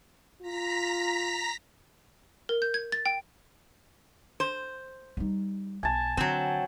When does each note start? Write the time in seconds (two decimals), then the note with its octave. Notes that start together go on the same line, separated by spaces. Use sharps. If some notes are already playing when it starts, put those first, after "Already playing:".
0.42 F4 A#5 A#6 B6
2.49 A#4
2.62 G6
2.74 G#6
2.92 A6
3.06 G5
4.40 C5
5.17 G3 D#4
5.83 B1 G#5 A5
6.17 D3 F#3 C4